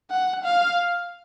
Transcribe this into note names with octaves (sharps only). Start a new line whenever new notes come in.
F#5
F5